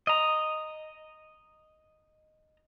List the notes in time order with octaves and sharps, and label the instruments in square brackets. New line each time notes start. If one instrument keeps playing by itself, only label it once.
[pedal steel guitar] D#5 A#5